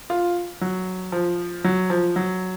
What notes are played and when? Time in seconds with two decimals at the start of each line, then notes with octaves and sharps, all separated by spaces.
0.10 F4
0.62 F#3
1.12 F3
1.65 F#3
1.90 F3
2.16 F#3